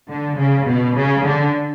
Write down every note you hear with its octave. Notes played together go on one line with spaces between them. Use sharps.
D3
C#3
B2
C#3
D3